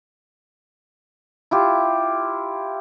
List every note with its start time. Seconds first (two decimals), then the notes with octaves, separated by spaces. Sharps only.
1.51 E4 F4 G4